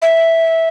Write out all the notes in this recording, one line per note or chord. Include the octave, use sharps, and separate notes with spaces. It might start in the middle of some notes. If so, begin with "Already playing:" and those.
E5